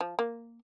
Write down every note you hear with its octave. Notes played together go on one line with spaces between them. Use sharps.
F3
A#3